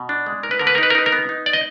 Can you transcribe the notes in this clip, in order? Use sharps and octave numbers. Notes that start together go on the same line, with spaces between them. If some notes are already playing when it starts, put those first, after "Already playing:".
Already playing: B2
D4
G#3
D#4 A#4
B4
D3 A#4
B4
A#4
D#4 B4
A#4
D#4 B4
A#4
B3
D#4
D5
D#5